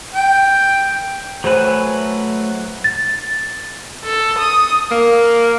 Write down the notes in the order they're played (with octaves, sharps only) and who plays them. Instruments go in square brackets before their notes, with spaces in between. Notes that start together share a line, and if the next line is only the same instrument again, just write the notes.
[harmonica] G5
[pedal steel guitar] F#3 A3 B4 [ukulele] C5 G#5
[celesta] A6
[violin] A4
D#6
[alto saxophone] A#3